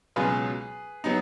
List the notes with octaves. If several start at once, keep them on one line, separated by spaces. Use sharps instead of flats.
C#2 B2 F#3 C#4 F4 G#4 B4
F#3 B3 D#4